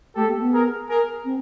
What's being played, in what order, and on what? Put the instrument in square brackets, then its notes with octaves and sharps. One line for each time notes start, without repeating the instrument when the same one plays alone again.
[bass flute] A3 [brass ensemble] G4 A4
[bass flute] A#3
B3
[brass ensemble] G#4 A#4
G#4 A#4
[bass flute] C4